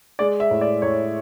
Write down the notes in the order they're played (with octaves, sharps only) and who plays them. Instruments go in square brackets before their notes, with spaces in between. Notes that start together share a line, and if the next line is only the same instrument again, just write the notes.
[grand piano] G#3 D5
E5
A2
D5
A2 C#5